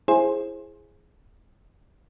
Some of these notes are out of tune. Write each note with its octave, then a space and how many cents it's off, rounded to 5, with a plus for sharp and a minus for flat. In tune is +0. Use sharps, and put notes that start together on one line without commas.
E4 +15 G#4 +0 C5 +20